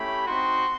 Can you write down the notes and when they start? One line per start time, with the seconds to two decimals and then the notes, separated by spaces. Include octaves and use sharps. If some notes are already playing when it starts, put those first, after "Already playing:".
Already playing: A3 C#4 E4 G4 B5
0.26 C4 D#4 F#4 C6